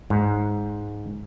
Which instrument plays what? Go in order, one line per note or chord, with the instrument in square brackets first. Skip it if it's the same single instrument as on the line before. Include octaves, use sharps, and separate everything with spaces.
[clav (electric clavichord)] G#2